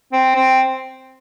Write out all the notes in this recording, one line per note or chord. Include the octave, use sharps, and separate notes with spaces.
C4
C4